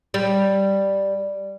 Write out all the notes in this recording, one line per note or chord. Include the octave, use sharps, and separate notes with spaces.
G3